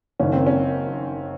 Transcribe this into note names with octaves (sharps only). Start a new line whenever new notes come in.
F#1 F#2 D#3 C#4
C4
C#4